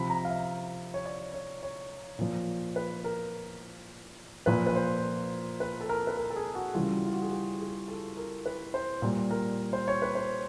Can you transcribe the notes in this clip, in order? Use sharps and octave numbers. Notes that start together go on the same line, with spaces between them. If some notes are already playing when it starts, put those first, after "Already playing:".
Already playing: C3 F3 B5
A#5
F5
E5
C#5
D5
C#5
C#5
A#2 F3
B4
A#4
A#2 F3 B4
B4
C5
B4
A4
A#4
B4
A#4
A4
G#4
F#4
C#3 E3 G3 F4
F#4
F4
F#4
G#4
G4
G#4
A4
A#4
B4
C5
A#2 G3
A#4
C5
C#5
B4
C5